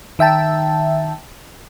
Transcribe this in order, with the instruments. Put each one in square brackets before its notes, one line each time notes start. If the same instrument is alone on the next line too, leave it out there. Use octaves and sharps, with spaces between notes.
[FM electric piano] D#3 E5 G5 A5